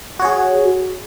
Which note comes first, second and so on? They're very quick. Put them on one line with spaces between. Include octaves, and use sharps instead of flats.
F#4 C#5 G#4